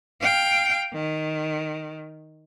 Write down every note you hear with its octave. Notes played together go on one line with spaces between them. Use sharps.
F5 G5
D#3